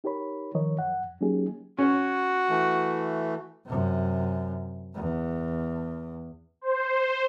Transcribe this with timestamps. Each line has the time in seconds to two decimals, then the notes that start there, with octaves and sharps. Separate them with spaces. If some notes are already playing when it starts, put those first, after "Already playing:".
0.04 D#4 G4 A#4 C#5 B5
0.55 C2 D#3 F3 A#4 C#5 D#5
0.79 F#2 F#5
1.04 F2
1.21 F#3 A#3 C#4 D#4 G4 G#4
1.79 C#4 F#4
2.50 E3 A3
3.66 F#2 C3
4.95 E2
6.61 C5